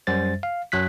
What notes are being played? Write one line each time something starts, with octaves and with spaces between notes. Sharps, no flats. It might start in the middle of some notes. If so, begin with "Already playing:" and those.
F#2 G3 C5 A6
F5
F#2 F#3 F#6 B6